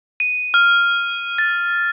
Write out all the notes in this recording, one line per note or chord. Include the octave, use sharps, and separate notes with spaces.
D#7
F6
A6